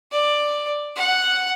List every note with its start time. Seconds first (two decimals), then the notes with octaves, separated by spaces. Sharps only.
0.12 D5
0.96 F#5